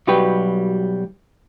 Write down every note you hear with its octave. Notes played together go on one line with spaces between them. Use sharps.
B1 F#3 G3 G4 B4 G5